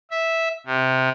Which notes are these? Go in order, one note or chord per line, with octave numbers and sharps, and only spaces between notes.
E5
C3